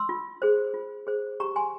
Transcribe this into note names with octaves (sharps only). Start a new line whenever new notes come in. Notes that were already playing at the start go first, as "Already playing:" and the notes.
Already playing: C6 E6
F4
G#4 C5
F4
G#4 C5
G4 A#5 C#6
G#5 C6